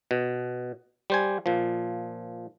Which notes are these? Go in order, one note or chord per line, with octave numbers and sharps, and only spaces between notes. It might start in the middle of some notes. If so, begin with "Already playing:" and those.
B2
G3 C5 G#5
A#2 F3